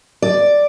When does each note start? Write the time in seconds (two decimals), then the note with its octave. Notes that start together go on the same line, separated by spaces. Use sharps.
0.22 D5